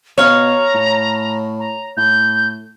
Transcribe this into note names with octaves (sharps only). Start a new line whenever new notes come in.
B2 C#5 F5 A#5
A2
A#5
A2 G6